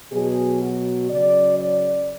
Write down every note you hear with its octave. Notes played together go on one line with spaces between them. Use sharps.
B2 F#3 G#4
F#4
C#3 F#3 D5
D5